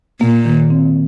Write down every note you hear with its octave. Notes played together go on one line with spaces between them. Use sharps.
A#2 A#3
D#3
C4